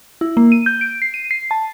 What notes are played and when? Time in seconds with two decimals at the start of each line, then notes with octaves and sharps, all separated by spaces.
0.21 E4
0.37 A#3
0.52 D#7
0.66 G6
0.81 D7
1.02 C7
1.14 D#7
1.31 C7
1.51 A5